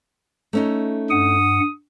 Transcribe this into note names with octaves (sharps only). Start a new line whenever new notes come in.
A3 C#4 D#4
G2 F#5 D#6